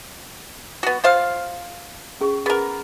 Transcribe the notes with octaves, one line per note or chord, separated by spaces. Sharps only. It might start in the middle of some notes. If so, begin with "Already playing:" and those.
B3 F#4
F4 C5 F5
C#4 G#4 C#6
B3 G#4 A#4